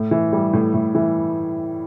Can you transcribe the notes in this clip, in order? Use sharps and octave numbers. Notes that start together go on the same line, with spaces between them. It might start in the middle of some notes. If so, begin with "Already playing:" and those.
Already playing: A2
E3
G3
A2
A2
E3